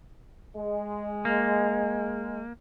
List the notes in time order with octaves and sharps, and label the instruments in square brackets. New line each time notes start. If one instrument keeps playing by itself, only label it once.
[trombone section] G#3
[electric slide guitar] A#3